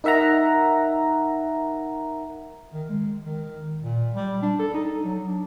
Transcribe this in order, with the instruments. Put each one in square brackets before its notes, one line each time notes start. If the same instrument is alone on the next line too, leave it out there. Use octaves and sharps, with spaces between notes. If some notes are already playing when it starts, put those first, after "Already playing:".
[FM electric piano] D#4 A#4 E5 F#5 A#5
[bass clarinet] D#3
G#3
D#3
A#2
G3
D4
A4
D#4
F#3
D4